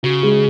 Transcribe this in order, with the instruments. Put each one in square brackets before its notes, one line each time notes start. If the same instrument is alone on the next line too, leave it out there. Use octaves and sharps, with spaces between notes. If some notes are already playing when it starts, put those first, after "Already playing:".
[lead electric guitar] C#3 [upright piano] F#4
[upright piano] G#3 G#4